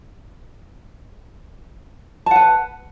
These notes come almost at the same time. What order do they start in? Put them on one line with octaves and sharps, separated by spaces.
A5 F#5 B4